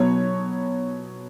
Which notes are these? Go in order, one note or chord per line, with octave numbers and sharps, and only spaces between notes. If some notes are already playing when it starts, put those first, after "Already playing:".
Already playing: B2 F#3 B3 C#5